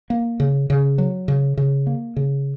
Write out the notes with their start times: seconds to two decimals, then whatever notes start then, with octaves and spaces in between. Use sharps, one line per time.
0.10 A#3
0.40 C#3
0.70 C#3
0.98 F#3
1.28 C#3
1.57 C#3
1.87 A#3
2.16 C#3